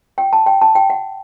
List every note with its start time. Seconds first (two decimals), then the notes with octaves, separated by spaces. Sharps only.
0.18 G5
0.33 A5
0.46 G5
0.61 A5
0.75 G5
0.90 F#5